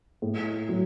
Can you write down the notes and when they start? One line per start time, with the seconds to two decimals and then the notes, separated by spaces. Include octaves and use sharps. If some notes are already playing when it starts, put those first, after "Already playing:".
0.22 A2
0.69 F#3